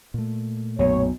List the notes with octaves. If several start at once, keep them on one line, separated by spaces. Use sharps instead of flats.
A#2 A3
B1 F#2 B2 C#5